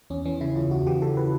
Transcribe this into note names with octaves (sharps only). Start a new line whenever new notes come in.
E2 C#4
E3 C#4
C#3 E4
E2 F4
E2 F#4
E3 G4
C#3 A4
B4